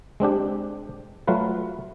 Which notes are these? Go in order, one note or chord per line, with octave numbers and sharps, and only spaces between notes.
G#3 C4 D4 G4
F#3 A3 F4 B4